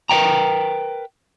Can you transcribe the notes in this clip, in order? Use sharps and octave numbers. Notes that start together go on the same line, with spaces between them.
A#4 B4 D#5 G5 A#5